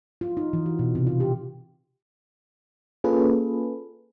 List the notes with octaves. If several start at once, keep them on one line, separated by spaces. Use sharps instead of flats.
F4
D#4
E3
F#4
B2
C3
F4
G4
A#3 C#4 F4 G#4 A4 B4